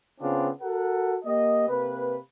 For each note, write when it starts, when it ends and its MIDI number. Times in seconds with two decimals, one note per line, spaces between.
0.21 0.49 49
0.21 0.49 59
0.21 0.49 60
0.21 0.49 62
0.21 0.49 65
0.62 1.17 66
0.62 1.17 69
0.62 1.17 70
0.62 1.17 78
1.25 1.68 58
1.25 1.68 67
1.25 1.68 75
1.69 2.19 48
1.69 2.19 58
1.69 2.19 71